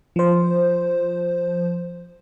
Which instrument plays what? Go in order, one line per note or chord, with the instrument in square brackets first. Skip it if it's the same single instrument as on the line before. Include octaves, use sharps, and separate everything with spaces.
[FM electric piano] F3 C5